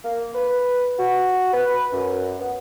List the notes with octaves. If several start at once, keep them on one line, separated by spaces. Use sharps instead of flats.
A#3
B4
F#4
B4
F#2
B3